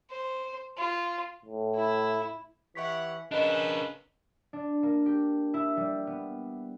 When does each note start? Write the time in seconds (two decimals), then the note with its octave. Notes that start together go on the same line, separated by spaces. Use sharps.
0.10 C5
0.77 F4
1.45 A2
1.75 E4
2.75 E3 G4 C#5 E5 F#5 C#6 B6
3.31 C#3 D4 A#4 B4 D#5
4.53 D4
4.83 A#3
5.06 G4
5.54 E4
5.77 G3
6.07 B3